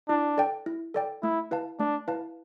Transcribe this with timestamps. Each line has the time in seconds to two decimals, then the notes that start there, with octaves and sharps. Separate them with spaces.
0.09 D4 E4
0.38 A4 D5 G5
0.66 E4
0.94 A4 D5 G5
1.23 A3 E4
1.51 E4 B4 F5 A5
1.79 A3 D4
2.08 E4 B4 F5 A5